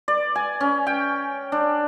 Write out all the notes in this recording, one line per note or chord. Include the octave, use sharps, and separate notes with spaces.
D5
G#5
C#4
G5
D4